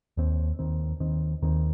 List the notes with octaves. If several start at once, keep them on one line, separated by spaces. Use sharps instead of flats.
D#2 D#3 C4
D#2 D#3 C4
D#2 D#3 C4
D#2 D#3 C4